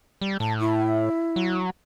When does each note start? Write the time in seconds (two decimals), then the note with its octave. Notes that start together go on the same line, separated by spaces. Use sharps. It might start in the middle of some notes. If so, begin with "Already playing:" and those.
0.22 G3
0.40 A2 A5
0.59 E4
1.36 F#3